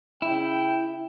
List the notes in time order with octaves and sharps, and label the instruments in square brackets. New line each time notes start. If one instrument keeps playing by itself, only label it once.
[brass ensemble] C#3 G5 [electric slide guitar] E4